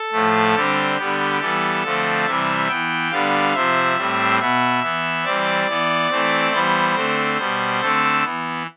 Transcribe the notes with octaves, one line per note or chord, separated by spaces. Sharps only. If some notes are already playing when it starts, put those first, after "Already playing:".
Already playing: A4
A2 F3 A3
D3 G3 C4 G4
D3 G3 B3
E3 G3 B3 A4
D3 F3 A3 C4
C3 E3 G3 E5
E3 B3 G5
D3 G3 B3 F5
C3 F3 C4 E5
A2 G3 C4
B2 B3 E5
E3 B3
E3 G3 C4 D5
E3 B3
E3 A3 C4
E3 G3 B3 C5
D3 A3 C4
B2 G3 B3
D3 A3 C4 A4
E3 B3